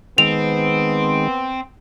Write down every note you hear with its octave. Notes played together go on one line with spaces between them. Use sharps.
D#3 G#3 B3 C4 F7